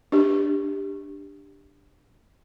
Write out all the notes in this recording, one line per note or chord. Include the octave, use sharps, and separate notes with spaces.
D4 G4